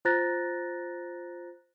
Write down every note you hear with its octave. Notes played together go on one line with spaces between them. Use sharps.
F4 C5 A#5 F#6 A6 A#6